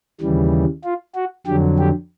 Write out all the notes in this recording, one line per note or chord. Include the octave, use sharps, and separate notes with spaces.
D#2 C#3 E3 G3
F4
F#4
F2 D3 F#3 G4
G4